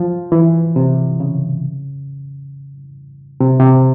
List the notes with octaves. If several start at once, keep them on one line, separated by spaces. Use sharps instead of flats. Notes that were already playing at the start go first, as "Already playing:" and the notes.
Already playing: F3
E3
C3
C#3
C3
C3